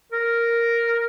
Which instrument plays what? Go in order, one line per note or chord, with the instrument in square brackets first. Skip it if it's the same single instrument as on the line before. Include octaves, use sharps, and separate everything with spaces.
[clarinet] A#4